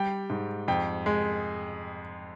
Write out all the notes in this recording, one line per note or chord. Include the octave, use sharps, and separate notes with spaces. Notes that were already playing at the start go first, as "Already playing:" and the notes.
Already playing: G3 G5
G#2
F2 G5
G#3